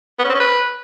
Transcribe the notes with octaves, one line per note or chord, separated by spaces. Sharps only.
B3
C#4
C4
C#4
B4